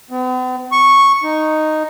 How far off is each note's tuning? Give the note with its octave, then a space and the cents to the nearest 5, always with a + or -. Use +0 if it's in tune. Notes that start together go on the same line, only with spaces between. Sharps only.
B3 +45
C#6 -5
D#4 -5